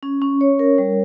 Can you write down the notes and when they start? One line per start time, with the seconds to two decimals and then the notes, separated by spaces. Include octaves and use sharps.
0.03 C#4
0.22 C#4
0.41 C#5
0.59 A#4
0.78 G3